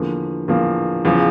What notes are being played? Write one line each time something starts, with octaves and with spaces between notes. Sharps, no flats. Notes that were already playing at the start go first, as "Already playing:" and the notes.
Already playing: E2 D3 F3 A#3
E2 D3 F3 A#3
E2 C#3 F3